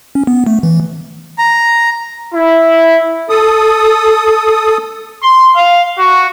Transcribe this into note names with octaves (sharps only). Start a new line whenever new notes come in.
C#4
B3
A3
E3
A#5
E4
A4 D#6
C6
F5
F#4